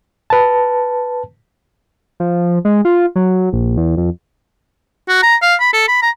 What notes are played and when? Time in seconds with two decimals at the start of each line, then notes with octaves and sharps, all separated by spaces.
0.30 B4 A5
2.20 F3
2.65 G#3
2.85 F4
3.16 F#3
3.53 A#1
3.77 E2
3.97 F2
5.09 F#4
5.23 A#5
5.42 F5
5.60 B5
5.73 A4
5.88 B5
6.02 A#5